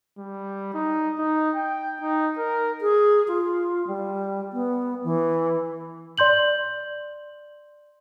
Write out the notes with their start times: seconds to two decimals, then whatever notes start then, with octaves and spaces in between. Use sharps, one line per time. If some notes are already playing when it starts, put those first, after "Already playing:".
0.18 G3
0.74 D#4
1.19 D#4
1.55 G5
2.01 D#4
2.38 A#4
2.81 G#4
3.28 F4
3.88 G3
4.53 B3
5.04 E3
6.18 D5 C6 G6 F#7